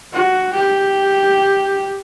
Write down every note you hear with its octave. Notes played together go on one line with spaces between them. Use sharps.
F#4
G4